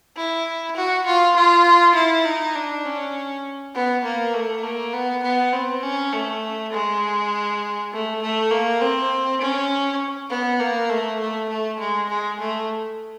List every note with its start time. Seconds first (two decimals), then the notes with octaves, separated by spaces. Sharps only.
0.16 E4
0.76 F#4
1.06 F4
1.36 F4
1.95 E4
2.25 D#4
2.55 D4
2.85 C#4
3.74 B3
4.04 A#3
4.34 A3
4.63 A#3
4.93 B3
5.23 B3
5.53 C4
5.83 C#4
6.12 A3
6.72 G#3
7.92 A3
8.22 A3
8.51 A#3
8.81 C4
9.41 C#4
10.30 B3
10.60 A#3
10.90 A3
11.20 A3
11.49 A3
11.80 G#3
12.09 G#3
12.40 A3